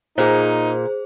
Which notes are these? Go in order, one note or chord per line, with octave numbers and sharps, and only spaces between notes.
A#2 D#4 G#4 C5